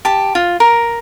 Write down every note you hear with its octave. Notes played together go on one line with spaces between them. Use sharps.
G4 A5
F4
A#4